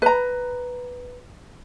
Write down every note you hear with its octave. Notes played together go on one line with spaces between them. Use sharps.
B4 A#5